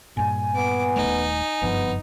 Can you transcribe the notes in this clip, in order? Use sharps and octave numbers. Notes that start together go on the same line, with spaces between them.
G2 A#2 G#5
B3 D6
D#1 G#1 A3 D#4
F#1 G2 F3 B3